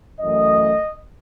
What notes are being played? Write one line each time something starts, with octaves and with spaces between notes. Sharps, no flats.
F#2 E3 A3 D#5